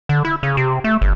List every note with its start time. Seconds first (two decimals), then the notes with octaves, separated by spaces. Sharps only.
0.09 D3
0.25 E4
0.43 C#3
0.57 C3
0.84 A3
1.01 G1